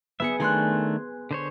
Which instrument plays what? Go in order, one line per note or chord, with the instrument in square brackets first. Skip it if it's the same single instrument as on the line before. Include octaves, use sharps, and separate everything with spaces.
[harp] B3 G#4 C#7 [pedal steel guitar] E5
[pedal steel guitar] D#3 A3 D4 [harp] G#5 C6 F#6
[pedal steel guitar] D3 C5 C#5